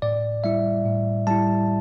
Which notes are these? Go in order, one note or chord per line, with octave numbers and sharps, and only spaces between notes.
A2 D5
G3 E4 E5
A2
G3 E4 A5